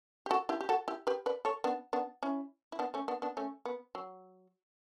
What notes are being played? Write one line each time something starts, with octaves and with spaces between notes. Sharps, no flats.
G4
F#4 A4
E4 G4
G4
F#4 A4
E4 G4
G4 B4
B4 D5
A4 C#5
B3 D4
B3 D4
C#4 E4
E4
B3 D4
A3 C#4
B3 D4
B3 D4
A3 C#4
B3
F#3